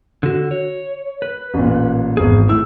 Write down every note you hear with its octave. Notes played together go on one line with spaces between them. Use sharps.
D3 F#4
C#5
B4
A1 A#2
G#1 E2 G#4
A2 E4 E6